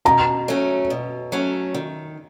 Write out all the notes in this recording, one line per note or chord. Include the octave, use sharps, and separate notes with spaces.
B2 A#5
F#3 A3 C#4
B2
F#3 A3 C#4
D#3